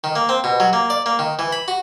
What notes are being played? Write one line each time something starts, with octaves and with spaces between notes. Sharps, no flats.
D#3
A#3
C4
B2
F#3
A#3
D5
A#3
D#3
E3
B5
F#4